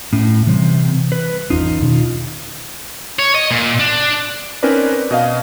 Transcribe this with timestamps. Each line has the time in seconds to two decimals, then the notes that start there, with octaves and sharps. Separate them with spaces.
0.13 A2 C#4
0.47 C3 E3 G3
1.12 B4
1.50 G#1 E2 C#4 D#4 F4
1.82 B2 D#3 C#4
3.19 C#5
3.35 D#5
3.51 A#2
3.80 D4
4.63 C4 C#4 D#4 A#4 B4 D5
5.11 B2 D#5 F5